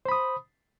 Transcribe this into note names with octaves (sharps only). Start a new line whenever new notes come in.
C5 B5 D#6